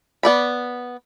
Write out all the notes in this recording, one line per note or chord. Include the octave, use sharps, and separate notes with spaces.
B3 D5 B5